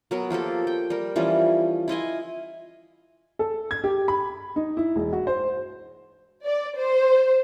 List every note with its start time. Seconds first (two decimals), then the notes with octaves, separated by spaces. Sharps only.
0.11 F#3 B3 A#4
0.30 F3 A#3 G4 A4
0.67 G5
0.90 G3 A#4
1.16 E3 F3 G3 C#4
1.88 E4 F4 D#5 G#5
3.39 A4
3.71 G#6
3.84 G4
4.08 B5
4.56 D#4
4.77 E4
4.96 E1
5.13 F#4
5.27 C5
6.45 D5
6.76 C5